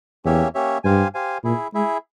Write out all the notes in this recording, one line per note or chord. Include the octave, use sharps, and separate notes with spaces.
E2 A#3 C#4 G4 C#5 E5
A#3 C#4 G4 C#5 E5
G2 G4 C5 F5 G#5
G4 C5 F5 G#5
A#2 E4 G#4 E5
G#3 E4 G#4 E5